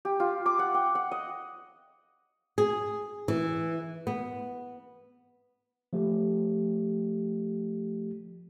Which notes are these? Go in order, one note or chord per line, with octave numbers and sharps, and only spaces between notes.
G4
F4
D6
F#5
G5
F#5
D#5
G#4
E3
B3
F3 A3 G4